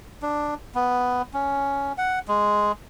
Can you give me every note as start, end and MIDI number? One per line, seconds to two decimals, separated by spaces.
0.22 0.55 62
0.75 1.22 59
1.34 1.93 61
1.98 2.19 78
2.28 2.72 56